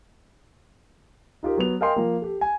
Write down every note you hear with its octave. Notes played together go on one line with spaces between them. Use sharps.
D#4 F4 G4 A#4
F#3 B3 F7
A#4 D#5 F5 G5 G#5 C6
F3 A#3
G4 A4
G#5